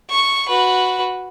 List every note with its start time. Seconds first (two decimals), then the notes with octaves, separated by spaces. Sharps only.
0.11 C#6
0.48 F#4 B4